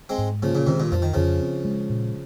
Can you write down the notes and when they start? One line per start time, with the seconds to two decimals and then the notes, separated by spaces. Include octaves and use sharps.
0.09 G#3 C4
0.18 G#2
0.43 C#3 F3 A#3
0.55 A#2 C#3
0.67 G#2 C3 D#3
0.80 G2 A#2
0.92 F2 F3
1.02 D#3
1.14 F2 C#3 F3
1.41 C4
1.65 G#3
1.90 A#2